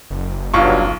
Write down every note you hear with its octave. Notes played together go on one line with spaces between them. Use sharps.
F#1
B1 G2 F#3 F4 C#6